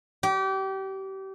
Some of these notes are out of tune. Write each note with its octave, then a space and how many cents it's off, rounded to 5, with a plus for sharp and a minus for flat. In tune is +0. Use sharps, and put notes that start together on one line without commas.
G4 -30